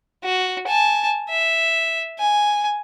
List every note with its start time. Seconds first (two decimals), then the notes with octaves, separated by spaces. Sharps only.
0.24 F#4
0.67 G#5 A5
1.29 E5
2.19 G#5